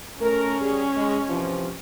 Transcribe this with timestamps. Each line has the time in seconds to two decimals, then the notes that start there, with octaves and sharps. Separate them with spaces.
0.21 A3 C#4 A#4
0.61 G3 G#4
0.95 G#3
1.29 C3 E3 F3